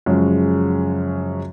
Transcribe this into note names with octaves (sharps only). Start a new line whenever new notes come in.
F#2 C#3 F3 G#3 C#4